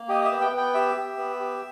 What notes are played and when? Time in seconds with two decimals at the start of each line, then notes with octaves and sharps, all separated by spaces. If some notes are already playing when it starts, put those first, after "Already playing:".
Already playing: A#3
0.08 G4 D#5
0.21 D#5
0.25 E5
0.31 B3
0.41 G5
0.53 B3 G5
0.74 G4 E5
0.96 G4
1.18 B3
1.40 G4